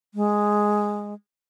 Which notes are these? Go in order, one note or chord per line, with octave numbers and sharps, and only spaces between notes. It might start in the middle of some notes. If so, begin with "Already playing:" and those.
G#3